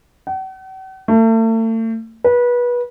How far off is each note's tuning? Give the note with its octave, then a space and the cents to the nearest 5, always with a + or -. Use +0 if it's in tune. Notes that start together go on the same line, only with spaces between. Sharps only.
F#5 +45
A3 +40
B4 -25